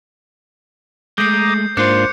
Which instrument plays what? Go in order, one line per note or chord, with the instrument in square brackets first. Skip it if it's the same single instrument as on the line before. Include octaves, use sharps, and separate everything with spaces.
[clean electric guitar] G#3 A3 [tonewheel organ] A#5 D6 D#6 [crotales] G6 C7
[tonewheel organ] G#2 A#3 [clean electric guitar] D4 F4 [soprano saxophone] C5 [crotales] D6 F#6 C#7